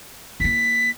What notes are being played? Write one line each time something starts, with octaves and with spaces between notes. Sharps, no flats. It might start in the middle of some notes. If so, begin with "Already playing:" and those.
A#3 E4 B6